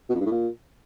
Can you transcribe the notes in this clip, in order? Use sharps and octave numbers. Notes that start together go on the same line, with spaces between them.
B2
F2
G2
A2
A#2